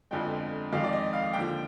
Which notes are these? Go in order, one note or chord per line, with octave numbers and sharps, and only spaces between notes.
G1 F2 D3 F3 G#3 G5
F2 D#3 G#3 F5
D5
D#5
F5
D#2 D3 F3 G5